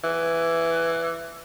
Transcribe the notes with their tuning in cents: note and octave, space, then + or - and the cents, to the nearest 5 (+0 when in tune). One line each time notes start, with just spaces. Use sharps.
E3 +10